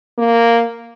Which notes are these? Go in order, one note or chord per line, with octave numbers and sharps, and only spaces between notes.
A#3